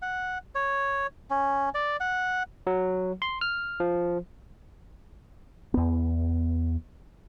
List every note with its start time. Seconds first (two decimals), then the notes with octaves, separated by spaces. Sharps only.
0.02 F#5
0.55 C#5
1.30 C#4
1.75 D5
2.00 F#5
2.67 F#3
3.22 C6
3.41 F6
3.80 F3
5.74 E2 B3